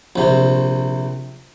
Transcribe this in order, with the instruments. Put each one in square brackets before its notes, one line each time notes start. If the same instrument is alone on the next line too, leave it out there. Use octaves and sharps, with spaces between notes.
[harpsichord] A#1 C3